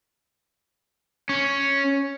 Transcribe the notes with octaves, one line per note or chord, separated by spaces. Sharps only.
C#4